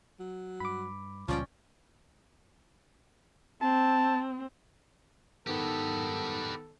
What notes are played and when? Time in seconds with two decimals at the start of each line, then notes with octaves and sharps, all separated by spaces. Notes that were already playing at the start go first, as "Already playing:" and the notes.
0.20 F#3
0.60 G2 B5 D6
1.28 C#2 A#2 F3 G3 C#4 D5 G5
3.62 C4 A5
5.47 D#3 B3 G4 A4 B4